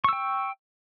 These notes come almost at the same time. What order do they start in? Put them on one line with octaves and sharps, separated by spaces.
C#6 E6 G5